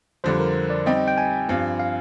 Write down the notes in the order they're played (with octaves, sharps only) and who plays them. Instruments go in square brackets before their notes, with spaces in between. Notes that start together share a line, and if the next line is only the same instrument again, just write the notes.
[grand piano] F2 D3 G3 [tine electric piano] C5
[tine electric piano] A#4
D5
[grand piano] G3 C4 D#4 G4 [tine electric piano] D#5
[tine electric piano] G5
G5
G#5
[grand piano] G2 F3 C4
[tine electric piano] F5